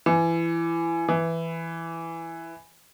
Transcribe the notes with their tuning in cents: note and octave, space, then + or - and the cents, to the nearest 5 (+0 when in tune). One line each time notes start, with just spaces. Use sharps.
E3 +20
E3 +5